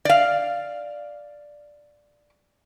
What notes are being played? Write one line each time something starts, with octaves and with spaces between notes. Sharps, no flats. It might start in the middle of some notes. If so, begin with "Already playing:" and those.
D5 F5